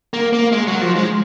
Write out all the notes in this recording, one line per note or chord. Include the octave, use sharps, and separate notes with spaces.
A#3
A#3
G#3
F#3
F3
G#3